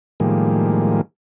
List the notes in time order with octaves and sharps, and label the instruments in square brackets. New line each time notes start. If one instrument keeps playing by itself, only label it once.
[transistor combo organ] A2 D#3 F3 G3 G#3 A#3